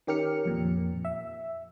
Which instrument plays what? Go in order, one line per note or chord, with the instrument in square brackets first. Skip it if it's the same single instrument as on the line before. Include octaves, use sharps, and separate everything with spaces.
[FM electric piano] D#3 C#4 G4 A#4 F6 C#7
F2 A#2
E5